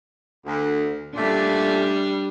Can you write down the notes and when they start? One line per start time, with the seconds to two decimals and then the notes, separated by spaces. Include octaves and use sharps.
0.46 D2
1.16 A#2 G3 A3 C#4 D4